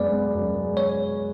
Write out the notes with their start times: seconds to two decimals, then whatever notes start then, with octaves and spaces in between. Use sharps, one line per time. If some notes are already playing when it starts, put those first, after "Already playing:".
Already playing: F#2 G#3 B3 D5
0.13 B3
0.34 F#2
0.55 G#3
0.77 C#5